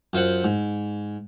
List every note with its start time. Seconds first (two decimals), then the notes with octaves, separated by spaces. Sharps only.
0.13 F#2 F4 C5 F#5
0.44 G#2